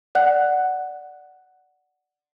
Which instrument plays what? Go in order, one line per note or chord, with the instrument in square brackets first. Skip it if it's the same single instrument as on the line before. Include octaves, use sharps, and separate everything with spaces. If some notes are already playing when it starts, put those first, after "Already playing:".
[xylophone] D5 F#5 F#6